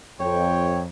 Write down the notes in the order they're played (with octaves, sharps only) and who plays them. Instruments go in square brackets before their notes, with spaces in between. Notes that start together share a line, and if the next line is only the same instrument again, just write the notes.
[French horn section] F2 [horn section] C#5 G5